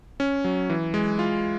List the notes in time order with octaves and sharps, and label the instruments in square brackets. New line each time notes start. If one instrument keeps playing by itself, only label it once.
[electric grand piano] C#4
F#3
E3
G#3
F4